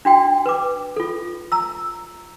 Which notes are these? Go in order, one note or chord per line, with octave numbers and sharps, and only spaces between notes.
D4 F#4 G5
B4 D6
F4 A4
A#5 E6